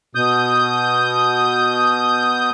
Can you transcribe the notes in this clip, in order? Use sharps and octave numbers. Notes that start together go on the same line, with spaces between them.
B2 D#6 G6